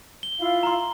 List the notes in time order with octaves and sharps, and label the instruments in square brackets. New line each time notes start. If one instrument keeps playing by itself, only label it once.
[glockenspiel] G7
[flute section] E4 F4 F5
[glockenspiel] A#5 C6